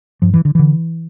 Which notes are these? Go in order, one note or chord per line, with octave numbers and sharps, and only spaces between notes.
G2 F3
E3
D3
D3 E3